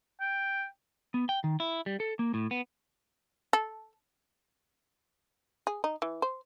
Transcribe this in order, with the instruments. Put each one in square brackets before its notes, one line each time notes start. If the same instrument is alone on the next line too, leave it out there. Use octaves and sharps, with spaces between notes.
[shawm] G5
[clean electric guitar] B3
G5
D#3
E4
G3
A4
A#3
A2
B3
[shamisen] A4
G#4
D#4
E3
C5